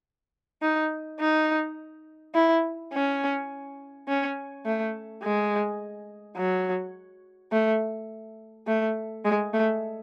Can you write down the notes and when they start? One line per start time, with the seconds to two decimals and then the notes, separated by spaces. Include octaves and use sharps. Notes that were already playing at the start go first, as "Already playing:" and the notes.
0.62 D#4
1.20 D#4
2.35 E4
2.93 C#4
4.08 C#4
4.66 A3
5.23 G#3
6.37 F#3
7.52 A3
8.67 A3
9.25 G#3
9.54 A3